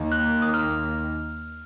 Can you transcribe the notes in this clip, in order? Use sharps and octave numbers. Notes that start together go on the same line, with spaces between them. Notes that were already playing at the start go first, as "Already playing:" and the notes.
Already playing: D#2 D#3 A#3
F#6
D#6
F6